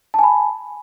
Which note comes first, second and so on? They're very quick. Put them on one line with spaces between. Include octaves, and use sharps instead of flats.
A5 G#5 B5